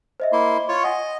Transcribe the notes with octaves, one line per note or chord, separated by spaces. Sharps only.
C5 D#5 E5
A#3 E4 C6
F4 C#5 C#6
D#5 F#5 G#5